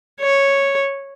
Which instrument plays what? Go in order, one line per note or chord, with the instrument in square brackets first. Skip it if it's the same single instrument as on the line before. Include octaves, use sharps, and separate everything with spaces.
[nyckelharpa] C#5